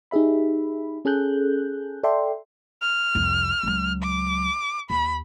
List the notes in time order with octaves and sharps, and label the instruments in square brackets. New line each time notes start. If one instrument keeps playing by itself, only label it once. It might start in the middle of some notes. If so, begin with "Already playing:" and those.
[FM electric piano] D#4 G4 G#4 E5 B5
C#4 G#4 A4 F#6 G6
A4 D5 E5 G5 C6
[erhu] F6
[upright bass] C2 F2
C#2 F#3
[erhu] D6
[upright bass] D#2 [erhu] B5